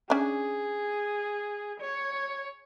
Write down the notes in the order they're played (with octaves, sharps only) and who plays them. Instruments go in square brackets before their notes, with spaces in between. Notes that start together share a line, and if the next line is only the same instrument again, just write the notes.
[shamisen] C#4 D4 [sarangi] G#4
[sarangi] C#5